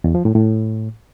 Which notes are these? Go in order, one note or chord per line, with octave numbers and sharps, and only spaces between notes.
E2
F3
A2
A2